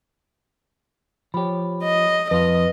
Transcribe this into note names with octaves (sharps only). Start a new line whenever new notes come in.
F3 G4 C#5 B5
D#5
F2 F4 B4 D#5